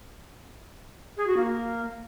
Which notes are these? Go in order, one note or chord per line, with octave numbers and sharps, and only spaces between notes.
G#4
F#4
A#3